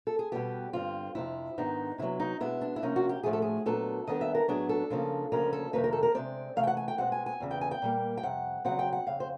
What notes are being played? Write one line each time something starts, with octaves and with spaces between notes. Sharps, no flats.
A4
G#4
B2 G3 B3 G4
G2 D3 G3 C4 F4
F2 C3 F3 E4
G#2 D#3 G#3 B3 D4 D#4
C3 D#3 F#3 B3 E4
D#4
B2 G#3 B3 D4 E4
D4
E4
C3 F3 A#3 C#4 D#4
F#4
G4
A2 F3 A3 G#4
A4
G#4
A#2 F#3 B3 D4 A4
D#2 D#3 G3 B3 D4 D#5
E5
A#4
A2 F#3 B3 D4 G#4
A4
C#3 F3 A#3 D4
D2 C#3 F3 A#3 C#4 A#4
A4
F2 C3 D#3 G3 A#3 B4
A#4
A4
A#4
C3 E3 G#3 C4 D5
C3 E3 A3 F5
G5
F#5
G#5
G5
B2 G#3 C4 F#5
G#5
G#5
E2 C#3 E3
G5
G#5
G5
A#2 G3 A#3
G5
F2 C3 F#5
E2 C#3 F#3 C4 F#5
G5
F#5
F2 C#3 F5
C5